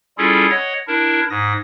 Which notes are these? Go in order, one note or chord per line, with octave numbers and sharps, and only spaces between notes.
G3 C#4 E4 F4 G#4 A4
C#5 D#5 F#5 G#6
D4 E4 A#4
G#2 D#6 A#6